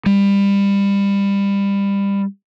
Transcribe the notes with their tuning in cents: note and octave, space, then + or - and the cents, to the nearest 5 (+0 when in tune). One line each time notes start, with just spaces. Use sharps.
G3 +25